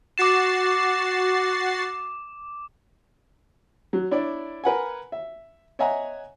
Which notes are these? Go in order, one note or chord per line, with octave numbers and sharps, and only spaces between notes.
F#4 D6 A6 C7 E7
F#3
D4 E4 C#5 D5
A#4 B4 F#5 G#5
E5
C#5 D#5 E5 F#5 G#5 A#5